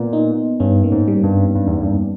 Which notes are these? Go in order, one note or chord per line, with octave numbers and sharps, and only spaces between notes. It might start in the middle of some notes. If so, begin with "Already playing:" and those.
Already playing: A#2 B3
D#4
G2 C#4
A#3
G#2
G3
G2
G2
E2
G2